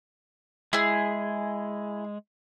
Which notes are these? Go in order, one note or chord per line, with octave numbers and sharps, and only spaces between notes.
G#3 E4 G#4